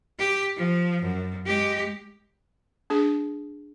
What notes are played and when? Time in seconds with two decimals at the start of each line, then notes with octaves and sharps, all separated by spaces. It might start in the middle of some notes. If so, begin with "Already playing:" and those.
0.19 G4
0.56 F3
1.02 F#2
1.46 G#3 G4
2.90 D4 G#4